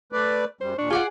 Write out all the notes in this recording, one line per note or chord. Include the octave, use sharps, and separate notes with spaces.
A3 B4 D5
F#2 G3 C5
D#2 A#2 D4 C#6
F4 G#4 D5 F#5